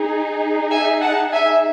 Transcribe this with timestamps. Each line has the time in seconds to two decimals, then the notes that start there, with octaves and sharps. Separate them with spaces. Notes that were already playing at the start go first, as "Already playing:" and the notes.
Already playing: D#4 G#4
0.71 E5 G#5
1.02 F#5 A5
1.32 E5 G#5